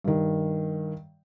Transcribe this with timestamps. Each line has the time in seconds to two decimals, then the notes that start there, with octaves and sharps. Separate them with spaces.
0.04 G2 D#3